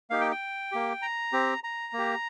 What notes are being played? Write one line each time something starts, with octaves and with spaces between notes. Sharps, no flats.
A#3 D#4 G4 F5
G5
G5
A#3 G4
A#5
C4 G4
A#5
A#3 G4